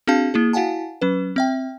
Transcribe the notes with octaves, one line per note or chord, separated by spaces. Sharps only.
C4 D4 F#4 G#4 F5 A5
A#3 E4 G#4
E4 F#4 F5 F#5 G#5 A5
F#3 C#4 B4
C4 E5 G5